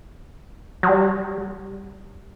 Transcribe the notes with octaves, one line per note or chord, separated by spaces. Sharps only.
F#3
G3